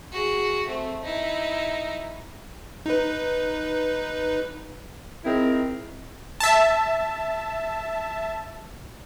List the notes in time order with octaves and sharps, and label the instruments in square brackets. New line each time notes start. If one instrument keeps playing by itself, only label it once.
[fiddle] F#4 G#4
A3 C4
D#4 E4
[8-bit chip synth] D#4 B4
[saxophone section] C4 D#4 E4 G#4 A#4
[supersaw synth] E5 A5